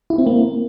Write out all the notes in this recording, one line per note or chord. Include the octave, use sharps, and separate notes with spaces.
E4
C4
A#3